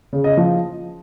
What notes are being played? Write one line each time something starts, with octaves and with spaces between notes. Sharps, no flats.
C#3
D#5
F3